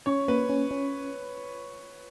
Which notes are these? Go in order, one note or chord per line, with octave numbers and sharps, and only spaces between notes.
C#4 C#5
A#3 B4
C#4
C#4